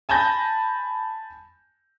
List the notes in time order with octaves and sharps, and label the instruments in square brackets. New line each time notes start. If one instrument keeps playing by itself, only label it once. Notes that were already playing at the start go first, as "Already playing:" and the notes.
[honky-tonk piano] G#5 A5 B5 G6 A#6